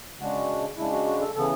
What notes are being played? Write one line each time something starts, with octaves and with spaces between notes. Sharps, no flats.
C#3 G#3 D4 F#4
C#3 G#3 D4 E4
F#4
F#4
A4
C#3 E3 B3 A4